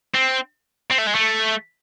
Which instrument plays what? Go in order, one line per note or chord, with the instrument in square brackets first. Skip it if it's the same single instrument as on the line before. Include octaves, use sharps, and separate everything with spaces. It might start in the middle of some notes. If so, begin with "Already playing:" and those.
[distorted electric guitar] C4
C4
A3
G#3
A3